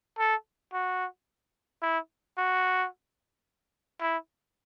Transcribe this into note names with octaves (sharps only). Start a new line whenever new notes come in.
A4
F#4
E4
F#4
E4